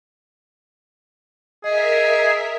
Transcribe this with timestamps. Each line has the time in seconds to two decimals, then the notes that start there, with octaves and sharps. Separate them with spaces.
1.64 G#4 A#4 D#5 E5 B6